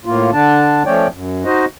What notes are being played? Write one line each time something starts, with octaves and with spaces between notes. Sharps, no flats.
A2 A#3 F4
D3 D4 A5
F3 A3 C#4 C#5 D5 G5
F#2
D#4 F#4 C5 D#5